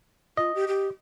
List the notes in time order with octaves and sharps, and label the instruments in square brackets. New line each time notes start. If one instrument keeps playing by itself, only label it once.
[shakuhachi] F4 [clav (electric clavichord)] D#5
[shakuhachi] G4
G4